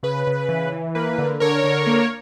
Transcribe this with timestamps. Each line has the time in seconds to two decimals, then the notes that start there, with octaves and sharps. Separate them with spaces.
0.03 C#3 B4
0.27 C#3
0.49 E3
0.72 E3
0.95 A#3 B4
1.18 D3
1.40 D3 A#4 C#5
1.64 D3
1.87 A#3